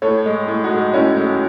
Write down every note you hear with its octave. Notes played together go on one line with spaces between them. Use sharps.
A2 A4 C#5
G#3
A2
D#4 F#4
G#3
A2 C#4 E4
G#3